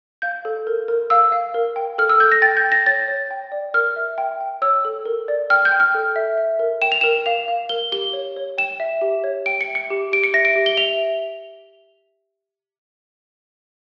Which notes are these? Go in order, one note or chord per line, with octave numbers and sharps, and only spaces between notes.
F5 G6
A4
A#4
A#4
F5 E6
F5
A#4
G5
A4 F6
E6
A4 G6
A#6
G5 A6
G6
G5
A#6
C#5 A6
C#5
G5
D5
A#4 F6
E5
G5
G5
C#5 E6
A4
A#4
D5
G5 F6
G6
G5
F6
A4
E5
E5
A#4
G5 E7
F7
A#4 E7
F5 F7
F5
A#4 G7
G4 G7
C#5
C#5
G5 E7
E5
G4
C#5
G5 D7
C#7
E5
C#7
G4
G4 D7
C#7
E5 A#6
D7
G4
G7
E5 F7